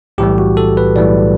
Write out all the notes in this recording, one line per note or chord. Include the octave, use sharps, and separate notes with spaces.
B1 A2 E3 G3 G4
F#4
A4
B4
B1 A2 E3 G3 D5